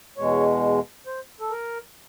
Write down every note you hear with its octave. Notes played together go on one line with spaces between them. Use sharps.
E2 B2 G#3 C#5
C5
A4
A#4